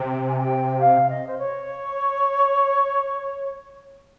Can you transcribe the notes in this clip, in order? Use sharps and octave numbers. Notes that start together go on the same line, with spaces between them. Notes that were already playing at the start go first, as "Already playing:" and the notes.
Already playing: C3 G5
G#5
G5
F5
D#5
C5
C#5